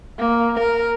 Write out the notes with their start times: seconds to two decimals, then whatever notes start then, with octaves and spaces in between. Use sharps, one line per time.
0.19 A#3
0.59 A#4